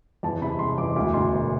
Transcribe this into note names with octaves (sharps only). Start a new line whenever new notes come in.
E2 A5
C3 B5
G#3 C6
E2 D6
D2 D6
D2 C6
E1